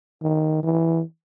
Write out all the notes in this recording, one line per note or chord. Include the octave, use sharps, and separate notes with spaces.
D#3
E3